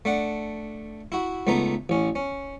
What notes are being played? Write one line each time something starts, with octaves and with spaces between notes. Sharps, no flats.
A3 D4 F#5
E4 F#4
C#2 A3 B3 D#4 A#5
A1 C#4
C#4